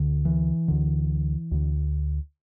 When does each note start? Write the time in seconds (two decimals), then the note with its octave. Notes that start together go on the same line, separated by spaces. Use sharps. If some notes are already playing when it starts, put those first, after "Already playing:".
Already playing: D2 D3
0.25 E3
0.68 D2 D3
1.51 D2 D3